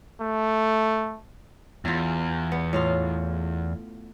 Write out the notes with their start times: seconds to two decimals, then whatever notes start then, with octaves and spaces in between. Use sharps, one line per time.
0.20 A3
1.85 E2 E4 F4
2.52 B3
2.73 A2 F4 F5